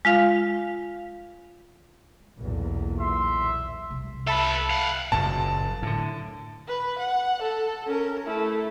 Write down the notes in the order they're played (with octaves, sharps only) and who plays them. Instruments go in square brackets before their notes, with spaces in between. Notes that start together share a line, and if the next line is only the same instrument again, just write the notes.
[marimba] G#3 F4 F5
[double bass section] B1 E2 A#2
[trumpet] E5 [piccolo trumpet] C6
[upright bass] C2
[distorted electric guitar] A4 B4 [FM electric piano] E5 A5 B5
[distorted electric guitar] F5 F#5
[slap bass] F#1 F#2 A#2 [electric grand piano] A5
[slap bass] A2 D3
[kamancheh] B4
F#5
A4
C#4 A#4
A3 E4